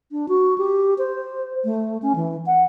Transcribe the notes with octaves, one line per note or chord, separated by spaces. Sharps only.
D4
F#4
G4
C5
A3
C#4
E3
F#5